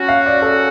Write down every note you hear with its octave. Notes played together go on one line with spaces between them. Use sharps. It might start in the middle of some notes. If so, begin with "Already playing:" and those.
Already playing: F#3 C#4 F#4
F5
D5
A4